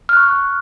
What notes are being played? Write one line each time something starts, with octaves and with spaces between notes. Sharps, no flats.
C#6 F6 F#6